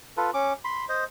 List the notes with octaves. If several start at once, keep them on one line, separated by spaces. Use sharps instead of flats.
F4 A4 B4
C#4 D6
B5 C6
C5 D#5